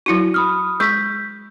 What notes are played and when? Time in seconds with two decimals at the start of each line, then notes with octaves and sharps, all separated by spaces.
0.06 F#3 E4 F#4
0.34 B5 D#6 F6
0.80 G#3 C#6 G6 B6